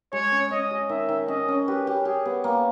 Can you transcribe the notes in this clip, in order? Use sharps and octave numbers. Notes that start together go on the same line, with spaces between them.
G#3 C#5
C#4
C#4 D#5
G#4
D#3 E5
D#3
C#4 D#5
C#4
G4 B4
G4
G4 G#4
B3
A#3